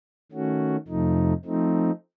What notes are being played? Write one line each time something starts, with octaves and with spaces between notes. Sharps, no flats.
D#3 A3 C#4 F#4
F2 C3 F3 A3 D#4
F3 A3 C4 D#4